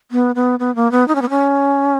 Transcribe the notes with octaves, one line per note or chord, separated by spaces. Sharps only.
B3
B3
B3
A#3
B3
D#4
C#4
B3
C#4